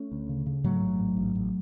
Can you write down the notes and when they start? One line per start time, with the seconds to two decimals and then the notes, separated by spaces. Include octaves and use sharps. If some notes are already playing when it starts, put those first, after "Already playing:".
Already playing: A3 C#4
0.12 D2
0.29 C#3
0.46 C#3
0.64 G#2 F#3 A3
0.81 A1
0.99 G#2
1.16 A1
1.35 A1